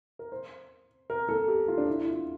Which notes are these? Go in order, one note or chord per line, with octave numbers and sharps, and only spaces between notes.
A#4
C5
A#4
A4
G4
F4
D4
E4
E4
F4